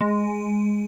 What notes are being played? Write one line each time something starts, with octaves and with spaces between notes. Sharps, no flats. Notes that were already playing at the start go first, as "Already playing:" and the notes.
G#3